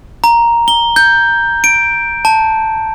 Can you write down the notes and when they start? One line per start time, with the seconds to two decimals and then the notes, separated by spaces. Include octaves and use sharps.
0.24 A#5
0.68 G7
0.96 G6
1.64 D7
2.25 A5